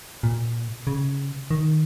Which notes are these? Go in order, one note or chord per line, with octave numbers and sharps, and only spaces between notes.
A#2
C#3
D#3